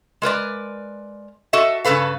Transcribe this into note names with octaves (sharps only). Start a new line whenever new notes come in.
G#3 A#4 B4 D5
F#4 A4 D#5 E5
G2 C#3 A3 A4 B4 F5